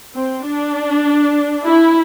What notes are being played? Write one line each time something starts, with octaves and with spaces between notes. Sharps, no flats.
C4
D4
E4